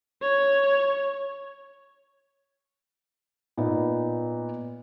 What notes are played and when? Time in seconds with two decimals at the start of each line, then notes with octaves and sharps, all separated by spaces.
0.22 C#5
3.57 A#2 B3 D#4